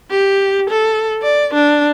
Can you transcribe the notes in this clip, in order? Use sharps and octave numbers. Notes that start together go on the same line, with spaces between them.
G4
A4
D5
D4